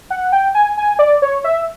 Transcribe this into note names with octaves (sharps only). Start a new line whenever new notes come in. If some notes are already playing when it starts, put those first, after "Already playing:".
F#5
G5
G#5
G#5
D5
C#5
E5